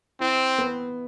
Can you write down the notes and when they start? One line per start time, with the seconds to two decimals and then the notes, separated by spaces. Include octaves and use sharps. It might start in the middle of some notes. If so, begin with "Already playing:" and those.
0.20 C4 E4
0.58 B3